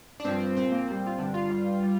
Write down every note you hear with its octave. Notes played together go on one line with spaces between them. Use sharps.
D4
G2 F3 C4
C4
A#2 F3 C4
A#3
A#2 G3 C4
F4
G2 D3 G3 D4
F4
G2 G3
G3